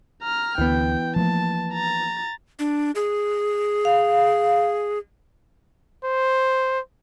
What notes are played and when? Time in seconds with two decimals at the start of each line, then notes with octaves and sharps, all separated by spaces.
0.23 A#5 F6
0.58 D2 E3 B3 G5
1.16 F3 A3 A#3 A5
1.73 A#5 A6
2.59 D4
2.95 G#4
3.85 F5
6.04 C5